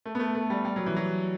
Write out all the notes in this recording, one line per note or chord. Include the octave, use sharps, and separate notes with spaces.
A3
B3
A3
A3
G3
G3
F#3
E3
F#3